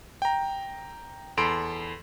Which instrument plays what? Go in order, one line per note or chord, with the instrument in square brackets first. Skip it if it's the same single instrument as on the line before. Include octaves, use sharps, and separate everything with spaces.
[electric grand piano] G5 A#5
E2 A4 B5 C6 D7